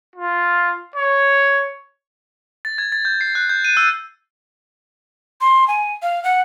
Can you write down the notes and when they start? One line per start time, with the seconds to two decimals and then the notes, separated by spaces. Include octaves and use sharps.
0.16 F4
0.96 C#5
2.65 A6
2.78 G#6
2.92 A6
3.05 G6
3.21 C7
3.35 F#6
3.49 G6
3.65 D#7
3.77 E6
5.41 C6
5.68 G#5
6.02 F5
6.24 F#5